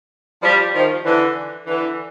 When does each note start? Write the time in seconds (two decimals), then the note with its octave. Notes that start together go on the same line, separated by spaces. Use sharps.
0.43 F3 G3
0.75 D#3 F3
1.05 D3 E3
1.66 D3 E3